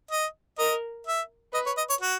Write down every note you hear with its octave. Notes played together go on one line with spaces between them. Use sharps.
D#5
A#4 D#5
E5
B4 D#5
C#5
D#5
C#5
F#4